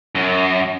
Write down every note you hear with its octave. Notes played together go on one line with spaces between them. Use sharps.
F#2